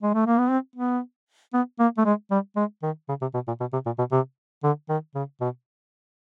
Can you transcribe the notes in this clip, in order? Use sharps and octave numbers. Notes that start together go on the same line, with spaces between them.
G#3
A3
A#3
B3
C4
B3
B3
A#3
A3
G#3
G3
G#3
D#3
C#3
C3
B2
A#2
B2
C3
A#2
B2
C3
D3
D#3
C#3
B2